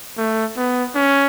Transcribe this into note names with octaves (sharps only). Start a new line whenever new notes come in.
A3
B3
C#4